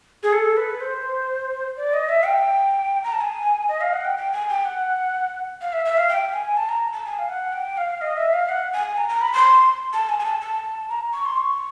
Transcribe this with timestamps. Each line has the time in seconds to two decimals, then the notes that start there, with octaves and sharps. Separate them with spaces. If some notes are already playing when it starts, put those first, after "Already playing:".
0.23 G#4
0.33 A4
0.57 B4
0.80 C5
1.77 D5
1.93 D#5
2.09 E5
2.25 G5
3.04 A#5
3.12 A5
3.21 G#5
3.69 D#5
3.81 F5
3.93 F#5
4.05 G5
4.17 G5
4.33 G#5
4.49 G5
4.65 F#5
5.61 F5
5.73 E5
5.85 E5
5.97 F5
6.09 G5
6.33 G#5
6.57 A5
6.69 A#5
6.93 A5
7.05 G#5
7.19 F5
7.29 F#5
7.53 G5
7.77 F5
8.01 D#5
8.17 E5
8.33 F5
8.49 F#5
8.73 G#5
8.97 A#5
9.09 A#5
9.21 B5
9.33 C6
9.93 A5
10.09 G#5
10.19 G#5
10.25 A5
10.41 A5
10.89 A#5
11.13 C#6
11.25 C6
11.37 C#6